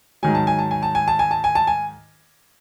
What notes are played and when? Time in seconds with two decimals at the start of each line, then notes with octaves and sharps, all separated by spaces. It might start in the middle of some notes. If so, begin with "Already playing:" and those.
0.23 G#2 D#3 F#3 G#5
0.35 A5
0.47 G#5
0.59 A5
0.71 G#5
0.83 A5
0.95 G#5
1.08 A5
1.19 G#5
1.31 A5
1.44 G#5
1.55 A5
1.67 G#5